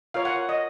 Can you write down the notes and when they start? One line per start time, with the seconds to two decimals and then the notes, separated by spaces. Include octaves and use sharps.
0.14 F4 A#4 C#5 F5
0.25 F#5
0.49 D#5